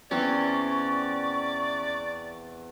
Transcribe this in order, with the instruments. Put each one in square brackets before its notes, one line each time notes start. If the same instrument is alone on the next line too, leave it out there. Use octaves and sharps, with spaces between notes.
[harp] E2 C4 [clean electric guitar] C#4 [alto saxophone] D5 [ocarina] C#6